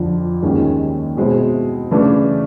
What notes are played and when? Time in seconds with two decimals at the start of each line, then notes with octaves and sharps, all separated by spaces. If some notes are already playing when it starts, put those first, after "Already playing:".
Already playing: F2 D3 F3
0.42 D#2 D#3 G#3 C#4
1.17 B2 G#3 C4 E4
1.91 C#3 E3 A3 D4